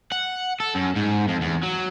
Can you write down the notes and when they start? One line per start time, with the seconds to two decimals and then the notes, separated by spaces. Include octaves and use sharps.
0.12 F#5
0.60 A4
0.75 F#2
0.95 G#2
1.28 F2
1.41 E2
1.63 F#3